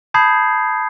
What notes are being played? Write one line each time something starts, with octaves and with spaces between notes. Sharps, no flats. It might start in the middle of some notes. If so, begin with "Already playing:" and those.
A5 B5 D#6 G6 G#6 C7